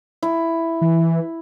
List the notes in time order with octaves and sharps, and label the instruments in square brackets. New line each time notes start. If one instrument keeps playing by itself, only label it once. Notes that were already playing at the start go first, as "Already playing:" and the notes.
[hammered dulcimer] E4
[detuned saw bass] E3